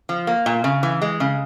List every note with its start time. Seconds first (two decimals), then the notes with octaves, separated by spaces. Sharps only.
0.09 F3
0.27 A#3
0.46 A#2
0.64 C#3
0.83 E3
1.02 G#3
1.20 C#3